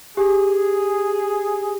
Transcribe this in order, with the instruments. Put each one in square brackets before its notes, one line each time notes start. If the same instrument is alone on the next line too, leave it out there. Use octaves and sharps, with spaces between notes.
[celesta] G4 [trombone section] G#4